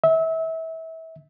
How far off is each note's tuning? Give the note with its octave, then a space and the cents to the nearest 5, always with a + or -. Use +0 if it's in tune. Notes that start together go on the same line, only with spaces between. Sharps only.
E5 -30